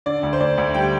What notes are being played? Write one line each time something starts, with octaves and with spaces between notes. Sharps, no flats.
D3 D5
D2
C5
D2 D5
D2
G3 G5